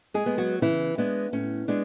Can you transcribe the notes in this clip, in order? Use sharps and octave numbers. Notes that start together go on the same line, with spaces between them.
G#3 G#4
G#3 B3
F#3 F#4
C#3 E3 E4
G#3 B3 D4
A2 C#4
G#3 B3 D4